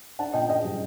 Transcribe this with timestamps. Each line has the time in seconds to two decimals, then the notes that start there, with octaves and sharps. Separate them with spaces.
0.19 D4 F#5 A5
0.33 A#2 D#5 G5
0.48 A#2 D#5 G5
0.65 G3